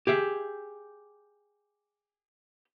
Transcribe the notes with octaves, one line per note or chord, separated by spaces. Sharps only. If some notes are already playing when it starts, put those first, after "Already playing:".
G4 G#4 E5